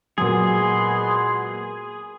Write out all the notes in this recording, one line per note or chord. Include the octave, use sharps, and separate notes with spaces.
A#2 F#3 G#3 B3 G#4 C6